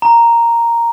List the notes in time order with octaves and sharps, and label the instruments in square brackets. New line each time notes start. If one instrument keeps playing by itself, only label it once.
[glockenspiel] A#5